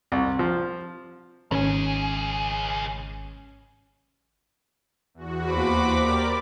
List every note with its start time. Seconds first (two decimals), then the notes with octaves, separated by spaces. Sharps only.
0.12 C2
0.39 F3
1.51 G#1 C#2 C#4 G#4
5.14 E2 F#4
5.48 D#2 C5 B5 D6
5.96 G4 A#4 D5